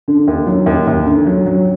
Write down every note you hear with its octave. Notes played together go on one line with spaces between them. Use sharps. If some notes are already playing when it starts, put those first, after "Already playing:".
D3
D#2
F#3
D#2
D#2
D3
F#3
F#3